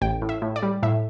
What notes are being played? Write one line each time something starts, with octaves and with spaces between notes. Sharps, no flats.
A1 G5
A2
E5
A2
D5
G3
A2 E5